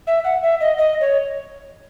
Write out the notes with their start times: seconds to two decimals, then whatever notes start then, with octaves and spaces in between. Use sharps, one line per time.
0.07 E5
0.25 F#5
0.43 E5
0.61 D#5
0.78 D#5
1.01 C#5